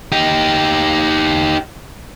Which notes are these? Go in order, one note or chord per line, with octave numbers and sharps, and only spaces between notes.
D#4 G4